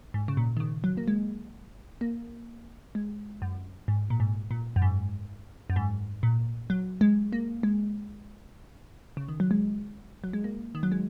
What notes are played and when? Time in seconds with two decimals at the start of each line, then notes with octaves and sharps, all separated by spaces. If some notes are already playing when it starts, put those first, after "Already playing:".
0.14 G#2
0.28 C#3
0.37 A#2
0.57 D#3
0.60 C#3
0.84 F#3
0.97 A#3
1.08 G#3
2.01 A#3
2.95 G#3
3.42 F#2
3.88 G#2
4.10 A#2
4.20 G#2
4.51 A#2
4.76 F#2
4.82 G#2
5.70 F#2
5.76 G#2
6.23 A#2
6.70 F#3
7.01 G#3
7.33 A#3
7.63 G#3
9.17 C#3
9.28 D#3
9.40 F#3
9.51 G#3
10.24 F#3
10.33 G#3
10.44 A#3
10.75 D#3
10.83 F#3
10.92 G#3